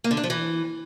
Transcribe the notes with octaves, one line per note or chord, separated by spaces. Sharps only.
A#3
D3
D4
F3
E3